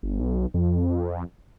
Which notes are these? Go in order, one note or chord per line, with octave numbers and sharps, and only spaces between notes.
G1
B1
F2